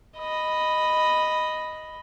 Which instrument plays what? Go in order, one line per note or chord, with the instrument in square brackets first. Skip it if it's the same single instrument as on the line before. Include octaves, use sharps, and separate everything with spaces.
[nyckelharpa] D#5 B5